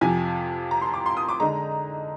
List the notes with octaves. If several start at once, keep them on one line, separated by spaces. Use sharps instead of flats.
F2 C3 F3 G#5
A#5
C6
D6
C6
D#6
D6
D3 G#3 D#4 A#5